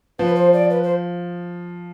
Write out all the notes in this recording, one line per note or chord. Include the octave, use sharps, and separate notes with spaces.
F3 B4
C5
D5
B4
C5